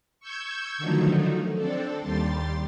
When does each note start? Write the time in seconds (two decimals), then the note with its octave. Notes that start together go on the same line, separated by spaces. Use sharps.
0.20 C#6 E6 G6 G#6
0.78 D3 D#3 F3 F#3 A3 D#4
1.55 C4 D4 A4
2.01 D#2 G3 G4 C6 A6